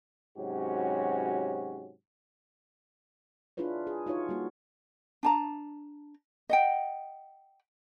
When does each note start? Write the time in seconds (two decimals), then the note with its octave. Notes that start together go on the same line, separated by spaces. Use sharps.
0.38 G#2 C3 F#3 C#4 F#4 G4
3.57 D4 E4 F4 G#4 B4 C#5
3.87 G#4
4.06 D#4 F4 F#4 C#5
4.29 G3 A#3 F#4
5.23 D4 A5 A#5
6.49 D#5 F#5 G5